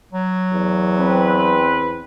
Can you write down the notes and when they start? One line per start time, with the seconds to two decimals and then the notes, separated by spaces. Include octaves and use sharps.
0.12 F#3
0.53 E2
0.98 C4 B4